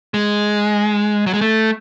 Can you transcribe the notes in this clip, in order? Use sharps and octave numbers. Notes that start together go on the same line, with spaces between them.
G#3
F#3
G#3
A3